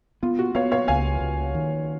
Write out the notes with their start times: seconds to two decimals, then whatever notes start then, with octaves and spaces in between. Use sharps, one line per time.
0.23 B3 F4
0.39 F#4
0.55 B3 C#5 F5
0.72 C#5 F5
0.88 C#2 F5 G#5
1.21 C#2
1.54 D#3